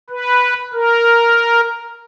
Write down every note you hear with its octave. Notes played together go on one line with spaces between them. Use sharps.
B4
A#4